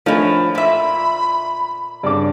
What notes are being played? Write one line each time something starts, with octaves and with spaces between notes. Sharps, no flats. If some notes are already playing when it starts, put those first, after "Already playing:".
A2 F3 A3 D4 A#4 C#5 D#5 G#5
A#2 E5 B5
G2 C#3 D4 D5 D6